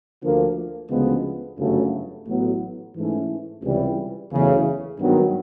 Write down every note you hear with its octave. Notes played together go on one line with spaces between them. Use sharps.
D2 D3 F3 A#3
D2 C#3 F3 G#3 B3
G1 F#2 C#3 F#3 A3
A1 A2 F#3 B3
G#2 E3 A3 C#4 E4
C#2 C3 E3 G3
F#1 E2 C#3 E3 A3
G#1 G2 D#3 F#3 B3